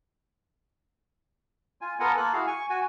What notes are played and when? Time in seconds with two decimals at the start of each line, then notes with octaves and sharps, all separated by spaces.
1.81 F4 G#5
2.00 B3 F4 A4 A#4 F#5 G#5
2.18 A#3 F4 A4 F#6
2.33 E4 F#4 G#4 F5
2.47 G#5 C#6
2.70 F#4 G#5